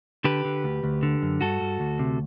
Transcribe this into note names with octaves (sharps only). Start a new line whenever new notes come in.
D3 G4 B4
D3
D2
D2
D3
F#2
G2 F#4 A4
G2
D2
C3